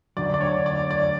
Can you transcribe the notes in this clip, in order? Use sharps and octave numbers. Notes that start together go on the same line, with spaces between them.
D2 D3 F#3 D5
D5
C#5
D5
D5